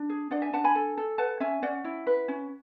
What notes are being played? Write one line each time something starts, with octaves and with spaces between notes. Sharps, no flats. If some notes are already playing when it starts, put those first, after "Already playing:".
Already playing: D4
G#4
D4 D5 F#5
E5 G#5
D4 F#5 A5
G#5 B5
A4
A4
B4 F#5 A5
C#4 E5 G#5
C#4 D5 F#5
E4
B4
C#4